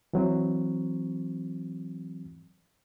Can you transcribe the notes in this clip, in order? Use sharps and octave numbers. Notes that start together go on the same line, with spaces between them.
E3 F#3 C4